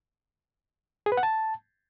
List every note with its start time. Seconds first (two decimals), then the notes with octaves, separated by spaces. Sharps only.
1.06 G#4
1.12 B4
1.17 F#5
1.23 A5